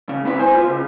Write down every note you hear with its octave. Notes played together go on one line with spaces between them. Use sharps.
C#3
G2 B3 E4 B4
C5 G#5
F4 B4
C#2 C#3